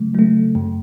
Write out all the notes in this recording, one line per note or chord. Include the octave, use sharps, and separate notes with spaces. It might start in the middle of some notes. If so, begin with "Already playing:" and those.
Already playing: C#3 F#3 A3
F#3 A3
F#2